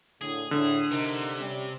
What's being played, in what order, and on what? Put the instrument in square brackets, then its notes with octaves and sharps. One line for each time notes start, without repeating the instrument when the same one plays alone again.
[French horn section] A2 D3 [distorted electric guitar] G#4
[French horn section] A2 [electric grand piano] D3
[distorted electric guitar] C3 [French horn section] D#4 A#4
[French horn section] G3 C4 C#4